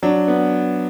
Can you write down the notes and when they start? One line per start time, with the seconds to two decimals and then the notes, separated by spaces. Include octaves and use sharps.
0.03 F#3 D4
0.28 B3